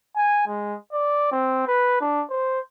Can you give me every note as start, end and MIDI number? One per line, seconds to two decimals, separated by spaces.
0.16 0.45 80
0.47 0.75 56
0.92 1.29 74
1.31 1.65 60
1.67 1.98 71
2.01 2.23 62
2.30 2.60 72